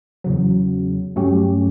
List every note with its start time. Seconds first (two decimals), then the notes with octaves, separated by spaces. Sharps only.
0.24 E2 C#3 F#3
1.16 G2 F#3 A3 C#4 G4